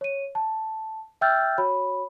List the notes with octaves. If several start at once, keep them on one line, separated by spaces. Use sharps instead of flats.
C#5 D#7
A5
E5 G5 E6 F6 G6 A6
F#4 C#5 B5